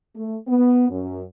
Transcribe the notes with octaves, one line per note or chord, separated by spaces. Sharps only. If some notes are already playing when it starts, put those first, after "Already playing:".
A3
B3
F#2